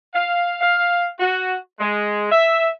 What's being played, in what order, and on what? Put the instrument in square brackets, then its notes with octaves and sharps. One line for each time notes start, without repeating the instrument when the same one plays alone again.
[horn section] F5
F5
F#4
G#3
E5